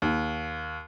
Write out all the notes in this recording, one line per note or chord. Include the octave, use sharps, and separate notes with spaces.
D#2